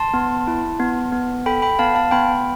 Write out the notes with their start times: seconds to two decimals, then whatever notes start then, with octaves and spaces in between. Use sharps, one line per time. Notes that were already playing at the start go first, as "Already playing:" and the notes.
Already playing: A5 C6
0.14 B3
0.47 E4
0.80 B3
1.12 B3
1.46 A4 G5 B5
1.62 G5 B5
1.79 B3 F5 A5
1.95 F5 A5
2.11 B3 G5 B5